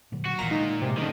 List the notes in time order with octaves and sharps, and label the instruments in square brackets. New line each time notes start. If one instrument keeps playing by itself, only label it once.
[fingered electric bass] A#2 D3 F#3
[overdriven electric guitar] F#4
[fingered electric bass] A1 D2 E3 [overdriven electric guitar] A#2 [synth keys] A#5
[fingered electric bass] G#3 [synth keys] D#4
[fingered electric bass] A2 [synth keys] C3 G#3
[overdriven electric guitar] A2 D#3 [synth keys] D3 D#4 [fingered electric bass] F#3 C#4